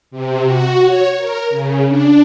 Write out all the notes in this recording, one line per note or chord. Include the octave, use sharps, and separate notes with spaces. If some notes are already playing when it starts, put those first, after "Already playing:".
C3
F#4
C#5
A#4
C#3
D4